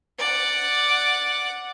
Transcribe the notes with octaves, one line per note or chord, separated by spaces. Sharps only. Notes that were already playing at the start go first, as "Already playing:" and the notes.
D5 F#5